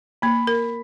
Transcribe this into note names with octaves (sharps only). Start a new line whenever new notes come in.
A#3 B5
A#4